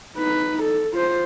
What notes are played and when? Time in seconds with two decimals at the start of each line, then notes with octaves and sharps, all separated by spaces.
0.17 D#4 B4
0.63 A4
0.93 F4 C5